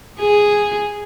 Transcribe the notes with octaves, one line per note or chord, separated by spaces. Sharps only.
G#4